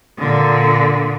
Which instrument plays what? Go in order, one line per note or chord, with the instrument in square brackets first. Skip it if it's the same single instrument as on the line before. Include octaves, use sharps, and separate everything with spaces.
[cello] A#2 D3